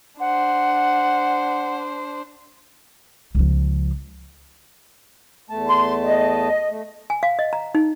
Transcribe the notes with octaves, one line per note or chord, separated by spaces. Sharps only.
D4 C5 F#5
C#2 F3
E2 A3 A5
C6
D#5
A3
G#5
F5
D#5
A#5
D#4